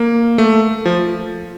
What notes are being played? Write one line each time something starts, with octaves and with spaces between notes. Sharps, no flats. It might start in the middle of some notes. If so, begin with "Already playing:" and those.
Already playing: A#3
A3
F3